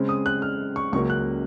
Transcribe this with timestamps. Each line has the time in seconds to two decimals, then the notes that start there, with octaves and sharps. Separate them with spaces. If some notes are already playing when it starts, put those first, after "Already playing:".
Already playing: C#3 G#3 C4
0.09 D#6
0.26 F#6
0.42 F6
0.76 C#6
0.92 C#2 C#3 F#3 A#3 C#6
1.10 F#6